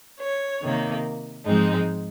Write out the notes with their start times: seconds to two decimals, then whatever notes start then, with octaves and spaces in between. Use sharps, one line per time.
0.21 C#5
0.62 C3 D#3 A#3
1.45 G#2 F3 G#3 C4 D#4